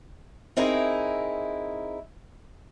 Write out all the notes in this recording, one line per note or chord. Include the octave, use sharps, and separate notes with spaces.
C4 D#4 E4 G#4 A#4